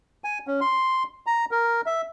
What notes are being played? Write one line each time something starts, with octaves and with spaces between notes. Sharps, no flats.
G#5
C#4
C6
A#5
A#4
E5